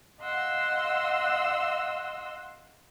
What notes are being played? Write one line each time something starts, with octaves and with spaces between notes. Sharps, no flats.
D#5 F5 F#5 C6 E6